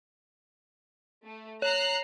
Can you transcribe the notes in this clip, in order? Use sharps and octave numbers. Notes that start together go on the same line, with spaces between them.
A3
C#5 A#5 F#6 C7